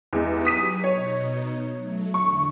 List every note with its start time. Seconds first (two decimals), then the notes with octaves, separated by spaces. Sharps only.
0.13 E2 G#3 D#4 G4 B4
0.45 F#3 D#6 B6 D#7
0.84 B2 D#4 C#5
1.76 F#3 A3
2.14 E2 D3 C#6